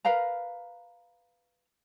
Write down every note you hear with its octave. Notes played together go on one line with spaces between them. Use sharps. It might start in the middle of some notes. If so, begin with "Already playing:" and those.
A#4 B4 F5 A#5